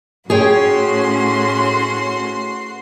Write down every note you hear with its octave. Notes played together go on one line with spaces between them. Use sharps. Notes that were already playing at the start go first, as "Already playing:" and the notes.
A2 C#4 F#4 G#4 C#5 G5 C6